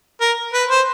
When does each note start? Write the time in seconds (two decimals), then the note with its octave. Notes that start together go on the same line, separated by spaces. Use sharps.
0.21 A#4
0.54 B4
0.70 C5